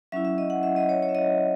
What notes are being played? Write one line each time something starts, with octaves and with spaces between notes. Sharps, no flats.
F#3 C#4 E4 E5
E5
D#5
F#5
E5
D#5
C#5
C#5
E5
D#5